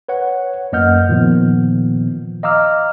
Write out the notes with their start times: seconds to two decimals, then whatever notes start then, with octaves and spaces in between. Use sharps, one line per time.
0.09 B4 C#5 F#5
0.72 F#2 A#3 D#5 F#5 F6 G6
1.09 A#2 D#3 F3 B3
2.43 D#5 F5 A#5 D6 E6 F6